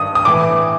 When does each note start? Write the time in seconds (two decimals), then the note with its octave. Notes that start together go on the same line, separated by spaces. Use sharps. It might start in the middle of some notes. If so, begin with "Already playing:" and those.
Already playing: G2 D#3 D#6
0.15 D#6
0.25 A2 E3 D6